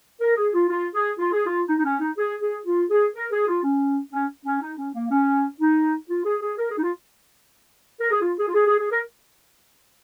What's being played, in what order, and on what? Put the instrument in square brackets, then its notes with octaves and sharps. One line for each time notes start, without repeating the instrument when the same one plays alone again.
[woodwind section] A#4
G#4
F4
F4
G#4
F4
G#4
F4
D#4
D#4
C#4
D#4
G#4
G#4
F4
G#4
A#4
G#4
F4
C#4
C#4
C#4
D#4
C#4
A#3
C#4
D#4
F4
G#4
G#4
A#4
G#4
D#4
F4
A#4
G#4
F4
G#4
F4
G#4
G#4
G#4
A#4